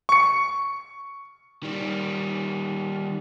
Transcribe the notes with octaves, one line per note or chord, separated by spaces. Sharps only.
C#6 C#7
D#3 G3